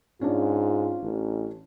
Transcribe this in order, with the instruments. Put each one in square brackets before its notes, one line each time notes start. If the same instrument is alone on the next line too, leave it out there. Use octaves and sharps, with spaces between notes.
[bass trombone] G#2 [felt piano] C#4 D4 [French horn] F4
[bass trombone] A1